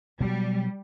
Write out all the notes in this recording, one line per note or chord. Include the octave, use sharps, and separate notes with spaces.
B2 F#3 G3